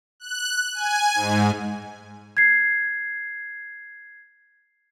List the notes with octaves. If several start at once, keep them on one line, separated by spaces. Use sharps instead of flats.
F#6
G#5
G#2
G#6 C7